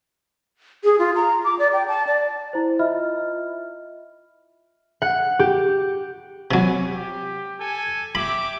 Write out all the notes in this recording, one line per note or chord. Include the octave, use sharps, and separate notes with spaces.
G#4
F4
A#5
D6
D5
G5
A5
D5
E4 C5
F4 D#5 E5 B5 F6
F#5
G4
C3 F#3 F#4 B4 G#5
G4
A4 G#5
G4 E5 B5 D6